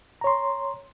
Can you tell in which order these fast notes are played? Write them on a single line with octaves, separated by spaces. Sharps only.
A#5 C#5 C6